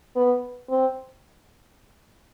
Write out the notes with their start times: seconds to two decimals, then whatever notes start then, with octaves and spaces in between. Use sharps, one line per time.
0.16 B3
0.69 C4